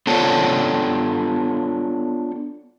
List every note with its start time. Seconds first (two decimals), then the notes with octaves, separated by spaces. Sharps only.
0.07 B3 D4 F4 A4 C5 C#5